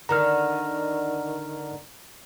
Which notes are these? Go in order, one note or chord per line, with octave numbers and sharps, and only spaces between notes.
D3 D#3 A#5 F6